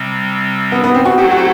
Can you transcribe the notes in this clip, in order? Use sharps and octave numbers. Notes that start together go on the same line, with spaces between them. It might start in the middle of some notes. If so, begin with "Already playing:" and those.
Already playing: C3 G3 C4
B3
B3
C4
F#4
F#3 A3 E4 G4 A4 C5
F#4